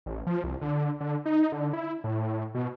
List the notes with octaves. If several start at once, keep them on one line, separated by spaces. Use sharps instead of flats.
A1
F3
C2
D3
D3
D#4
D3
E4
A2
B2